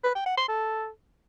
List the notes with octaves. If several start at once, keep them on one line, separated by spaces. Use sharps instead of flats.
B4
G5
F#5
C6
A4